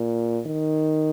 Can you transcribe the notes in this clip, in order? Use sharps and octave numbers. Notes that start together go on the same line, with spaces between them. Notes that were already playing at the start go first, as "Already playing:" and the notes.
Already playing: A#2
D#3